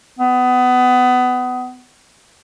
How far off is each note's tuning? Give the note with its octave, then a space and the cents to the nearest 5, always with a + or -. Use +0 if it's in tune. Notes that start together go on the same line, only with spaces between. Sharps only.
B3 +20